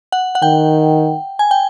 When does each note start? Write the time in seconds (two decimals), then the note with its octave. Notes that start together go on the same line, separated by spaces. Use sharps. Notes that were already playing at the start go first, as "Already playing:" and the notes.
0.12 F#5
0.35 F#5
0.42 D#3 G5
1.39 G#5
1.51 G5